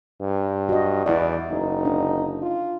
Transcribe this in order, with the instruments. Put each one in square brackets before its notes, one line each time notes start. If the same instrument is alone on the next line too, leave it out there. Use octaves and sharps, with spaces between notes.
[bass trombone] G2
[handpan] F#4 D#5
[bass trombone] E2 [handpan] E4 D5
[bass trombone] F#1 [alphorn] D#4
[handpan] D4
[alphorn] F4